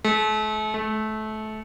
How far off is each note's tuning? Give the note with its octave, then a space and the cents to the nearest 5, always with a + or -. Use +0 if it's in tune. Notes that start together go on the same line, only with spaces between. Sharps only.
A3 -40
A3 -25